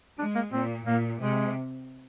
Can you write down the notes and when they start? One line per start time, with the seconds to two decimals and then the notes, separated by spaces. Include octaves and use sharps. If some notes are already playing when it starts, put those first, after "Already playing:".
0.19 G#3 D4
0.35 A#3
0.52 A#2 C4
0.86 A#2 A#3
1.20 C3 G#3